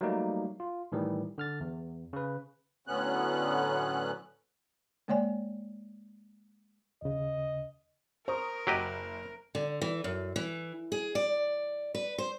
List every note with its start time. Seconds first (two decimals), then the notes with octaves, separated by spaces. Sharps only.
0.01 F#3 G3 A3 A#3 D#4
0.60 F4
0.92 A2 D#3 E3 G3
1.38 D3 F6 A6
1.60 E2
2.13 C#3 B4
2.87 A2 D3 F#3 B3 C#4 F#6
5.08 G#3 A#3 C#5 D5 G#5
7.02 D#2 C#3 D#5
8.28 A#4 C5 A#5 C#6 D#6
8.67 F#1 F#3 G4 D#5 F#6
9.55 D3
9.81 E3
10.04 F#2
10.36 E3
10.92 G#4
11.15 D5
11.95 B4
12.18 C5